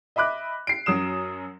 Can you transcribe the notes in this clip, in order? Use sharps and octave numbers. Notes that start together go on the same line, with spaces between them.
D#5 E5 B5 D6 F#6
C7 D7
F#2 F#3 D#6 E7